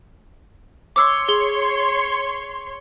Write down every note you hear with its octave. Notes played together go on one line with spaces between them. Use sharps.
C#5 C6 D6 E6
G#4 G7